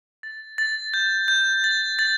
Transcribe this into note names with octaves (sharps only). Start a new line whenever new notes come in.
A6
A6
G6
G6
A6
A6